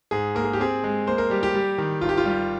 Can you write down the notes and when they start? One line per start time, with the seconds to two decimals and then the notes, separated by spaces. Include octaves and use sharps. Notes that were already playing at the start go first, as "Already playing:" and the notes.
0.11 G#2 G#4
0.35 A#3 A#4
0.44 G#4
0.53 G4
0.60 C4 G#4
0.84 G#3
1.07 A#3 C5
1.18 A#4
1.30 G3 G4
1.43 G4
1.54 G3
1.78 D#3
2.01 G#1 F4
2.09 G4
2.17 F4
2.25 G3